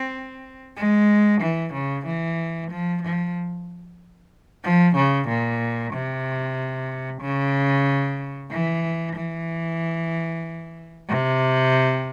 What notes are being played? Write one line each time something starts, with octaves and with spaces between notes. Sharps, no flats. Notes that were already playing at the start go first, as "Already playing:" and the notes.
Already playing: C4
G#3
E3
C#3
E3
F3
F3
F3
C#3
A#2
C3
C#3
E3
E3
C3